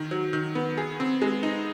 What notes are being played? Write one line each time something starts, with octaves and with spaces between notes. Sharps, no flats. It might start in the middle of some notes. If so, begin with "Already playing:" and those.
Already playing: D#3
F#3
D#3
B3
G#4
C4
G#3
D#4